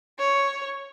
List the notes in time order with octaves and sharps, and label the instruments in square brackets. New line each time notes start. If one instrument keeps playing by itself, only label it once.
[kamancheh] C#5